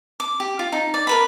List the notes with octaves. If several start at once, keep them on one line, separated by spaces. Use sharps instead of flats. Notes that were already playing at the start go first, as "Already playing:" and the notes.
D6
G4
F4
D#4
D5
A#4 B4 B5